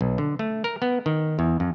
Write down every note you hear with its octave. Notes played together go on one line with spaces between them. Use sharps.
B1
D3
A3
A#4
B3
D#3
E2
F2